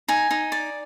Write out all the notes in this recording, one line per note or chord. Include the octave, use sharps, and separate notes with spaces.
D#4 G#5
D#4
D5